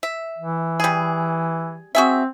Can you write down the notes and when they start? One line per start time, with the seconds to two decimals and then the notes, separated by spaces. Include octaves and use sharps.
0.03 E5
0.38 E3
0.80 G3 G#4
1.95 C4 F#4 G#4 E5